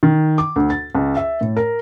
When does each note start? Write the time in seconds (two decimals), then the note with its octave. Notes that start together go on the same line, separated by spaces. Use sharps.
0.03 D#3
0.38 D6
0.56 D2
0.70 A6
0.95 C#2
1.17 E5
1.41 A2
1.57 A#4